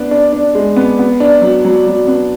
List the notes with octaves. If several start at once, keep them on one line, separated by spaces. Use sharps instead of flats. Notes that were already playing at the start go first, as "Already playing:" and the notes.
Already playing: B3 D4
D4
D4
G#3
B3
B3
D4
F#3
F#3
F#3
B3